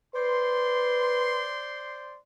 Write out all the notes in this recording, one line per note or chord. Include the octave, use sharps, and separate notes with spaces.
B4 C5 D5 C6